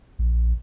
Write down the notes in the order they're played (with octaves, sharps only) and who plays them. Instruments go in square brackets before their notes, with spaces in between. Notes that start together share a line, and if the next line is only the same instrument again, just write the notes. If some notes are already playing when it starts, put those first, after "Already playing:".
[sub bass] A#1